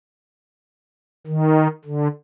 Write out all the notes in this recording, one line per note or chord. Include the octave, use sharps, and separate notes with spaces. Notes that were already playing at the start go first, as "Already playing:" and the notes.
D#3
D3